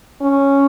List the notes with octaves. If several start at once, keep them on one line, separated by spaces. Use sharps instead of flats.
C#4